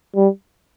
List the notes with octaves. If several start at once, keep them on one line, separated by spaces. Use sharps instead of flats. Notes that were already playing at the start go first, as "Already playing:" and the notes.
G3